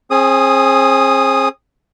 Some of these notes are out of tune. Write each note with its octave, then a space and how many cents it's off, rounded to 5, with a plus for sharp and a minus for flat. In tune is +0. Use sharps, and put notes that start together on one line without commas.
C4 +40 G#4 +10 D#6 -5